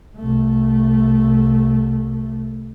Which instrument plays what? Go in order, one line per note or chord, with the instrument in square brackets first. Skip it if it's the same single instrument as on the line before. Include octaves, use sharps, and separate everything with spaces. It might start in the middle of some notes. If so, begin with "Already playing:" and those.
[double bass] C2 A3